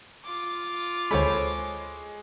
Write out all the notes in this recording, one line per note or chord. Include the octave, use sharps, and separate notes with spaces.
F4 D6
D2 G#3 A4 C5 C#5 B5